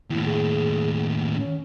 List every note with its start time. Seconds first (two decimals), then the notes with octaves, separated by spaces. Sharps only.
0.10 D#2 A2 E4
0.25 G#4
1.36 C#4